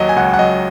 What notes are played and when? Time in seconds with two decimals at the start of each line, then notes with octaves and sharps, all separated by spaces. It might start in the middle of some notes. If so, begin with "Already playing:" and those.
Already playing: D#2 F#3 D#5
0.09 G#5
0.16 C#2 F#5
0.34 F#5
0.39 F#3 D#5